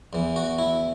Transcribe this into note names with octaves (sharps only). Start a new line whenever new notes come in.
E2 E3
F#4
E4